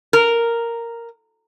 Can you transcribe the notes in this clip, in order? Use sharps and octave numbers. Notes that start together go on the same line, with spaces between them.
A#4